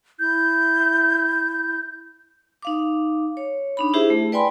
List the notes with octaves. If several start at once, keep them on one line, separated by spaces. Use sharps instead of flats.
E4 G6
D#4 F5 D6
C#5
D4 D#4 B5
E4 G4 G#4 C5 E5
A3
B4 D5 G5 G#5 B5 C6